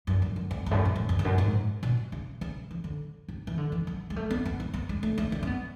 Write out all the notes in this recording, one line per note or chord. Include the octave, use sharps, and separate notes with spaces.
F#2
G#2
F#2
E2
E2
G#2
F#2
G#2
F#2
E2
E2
F#2
G#2
B2
C#3
C#3
E3
D3
C#3
E3
D3
E3
F#3
G#3
A3
B3
B3
C#4
B3
G#3
A3
A3
D4
C#4
B3